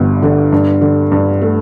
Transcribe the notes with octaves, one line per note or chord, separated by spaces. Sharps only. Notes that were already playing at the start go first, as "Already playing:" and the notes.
Already playing: G1 G2
D3
G2
D3
G2
A3